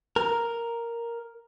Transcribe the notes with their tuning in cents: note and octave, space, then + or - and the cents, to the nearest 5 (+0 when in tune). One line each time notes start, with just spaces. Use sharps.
A#4 +0